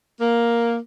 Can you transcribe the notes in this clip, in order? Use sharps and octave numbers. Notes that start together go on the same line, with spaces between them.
A#3